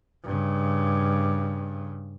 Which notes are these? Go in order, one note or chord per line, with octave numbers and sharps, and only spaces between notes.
G2 C#3